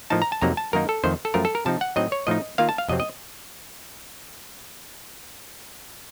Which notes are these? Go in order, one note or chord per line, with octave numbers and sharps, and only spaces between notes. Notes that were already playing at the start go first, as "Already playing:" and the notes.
A2 F3 A#3 D#4 A5
A#5
A5
F2 C3 F#3 A#3 D#4 A#5
A5
F#2 D#3 A#3 D#4 A#4
A4
F2 D#3 A3 C5
A4
F#2 F3 A3 C#4 F4 A#4
A4
A#4
C3 F3 C4 D#4 A5
F#5
A2 F#3 C4 D#4 D#5
C#5
A2 F3 A3 D#4 D#5
D#3 A#3 F4 F5
A5
F5
F2 C3 F#3 C4 D#5
D#5